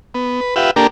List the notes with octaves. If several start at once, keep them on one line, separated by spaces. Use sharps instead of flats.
B3
B4
F4 G4 B4 E5 F#5
A#3 D4 G4 A4 A#4